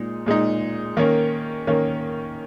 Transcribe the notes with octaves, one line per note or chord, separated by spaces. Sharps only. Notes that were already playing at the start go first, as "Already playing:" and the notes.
Already playing: A#2 G#3 D#4
A#2 G#3 D#4
D#3 A#3 C#4
D#3 A#3 C#4